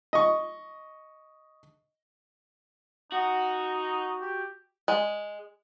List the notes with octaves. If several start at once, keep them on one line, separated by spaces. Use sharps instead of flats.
D#5 C#6
D#4 F#4
G4
G#3